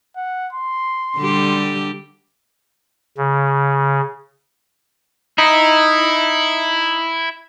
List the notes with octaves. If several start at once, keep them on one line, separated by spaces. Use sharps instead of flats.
F#5
C6
D3 G3 G4
C#3
D#4 E4